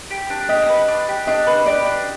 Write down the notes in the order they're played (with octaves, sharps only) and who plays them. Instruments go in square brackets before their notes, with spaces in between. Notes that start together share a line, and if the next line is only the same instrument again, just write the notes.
[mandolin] G4
D4
[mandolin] G4 [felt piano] D#5
[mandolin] B4
D4
G4
[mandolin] D4 [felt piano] D#5
[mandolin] B4
[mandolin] G4 [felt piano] D5
[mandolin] D4